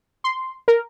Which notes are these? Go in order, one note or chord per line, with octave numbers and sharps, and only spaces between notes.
C6
A#4